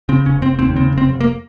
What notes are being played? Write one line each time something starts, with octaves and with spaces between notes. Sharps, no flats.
C#3 C4
F1 C#4
F1 C4
D#2 C4
C#3 C4
F1
C4
F1
A#3